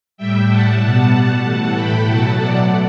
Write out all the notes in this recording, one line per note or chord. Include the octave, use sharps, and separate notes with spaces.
A2 G3 E5 G5
F#5 A5
B2 G3 F#5 A5
A2 E3 A3 F#5 A5
G5 B5
B2 F#3 A3 F#5 A5
D5 F#5